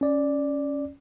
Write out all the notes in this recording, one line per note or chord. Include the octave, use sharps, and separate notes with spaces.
C#4 D5